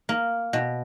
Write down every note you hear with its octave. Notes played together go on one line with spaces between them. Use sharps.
A#3
B2